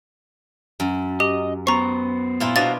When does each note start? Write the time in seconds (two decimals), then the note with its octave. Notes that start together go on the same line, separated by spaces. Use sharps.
0.80 F#2
1.20 G4 D#5
1.67 B3 C5 A#5 C#6
2.40 A#2 E4 F4
2.56 B2 D4 F#4 C5 D#5 F5 A6